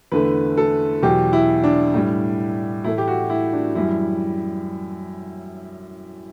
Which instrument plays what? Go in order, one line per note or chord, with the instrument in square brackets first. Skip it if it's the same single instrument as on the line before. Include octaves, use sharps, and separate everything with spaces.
[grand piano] E2 D3 A3 B4
A4
E2 B2 F#3 G4
E4
D4
A2 G3
A2 E3 A3 E4
G4
F#4
E4
D4
F#2 E3 G3 E4